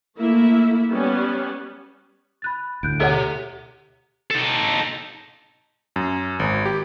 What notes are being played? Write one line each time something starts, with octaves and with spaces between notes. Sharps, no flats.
A3 A#3 E4 E5
G3 B3 C#4
B5 F#6 A6
D2 A2 F#6 G6 D7
G4 A4 C#5 E5 F#5
D#4 A4
F#2
G#1
G4